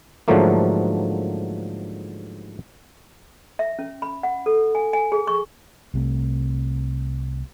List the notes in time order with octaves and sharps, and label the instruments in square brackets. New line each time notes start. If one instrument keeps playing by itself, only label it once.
[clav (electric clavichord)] G#2 D3 F3 F#3 A3 A#3
[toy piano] E5
C#4
B5
F#5
A4
G#5
G#5
G#4
C#6
[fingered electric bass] C2 C3 A3